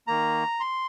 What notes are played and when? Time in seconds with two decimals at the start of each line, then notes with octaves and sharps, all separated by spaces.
0.07 D#3 A#3 A#5
0.60 C6